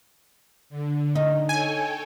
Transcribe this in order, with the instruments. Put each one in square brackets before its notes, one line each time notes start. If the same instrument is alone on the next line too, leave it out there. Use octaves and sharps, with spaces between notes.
[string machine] D3
[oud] D#4
[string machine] A4 C#5 G5 [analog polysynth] G#5